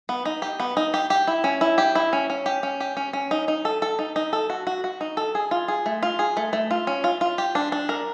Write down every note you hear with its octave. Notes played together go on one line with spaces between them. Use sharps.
B3
D#4
G4
B3
D#4
G4
G4
E4
C#4
E4
G4
E4
C#4
C#4
G4
C#4
G4
C#4
C#4
D#4
D#4
A4
A4
D#4
D#4
A4
F#4
F#4
F#4
D#4
A4
G#4
F4
G#4
A3
F4
G#4
A3
A3
F4
C#4
F4
F4
G4
D4
D4
A#4